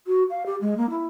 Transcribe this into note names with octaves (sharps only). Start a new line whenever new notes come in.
F#4
F5
G4
G#3
A#3
E4